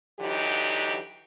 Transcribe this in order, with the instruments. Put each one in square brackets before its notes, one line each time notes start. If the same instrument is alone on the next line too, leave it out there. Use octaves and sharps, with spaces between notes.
[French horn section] D3 E3 F#3 D#4 G4